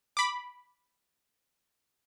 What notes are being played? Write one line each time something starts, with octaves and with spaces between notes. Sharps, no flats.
B5 D6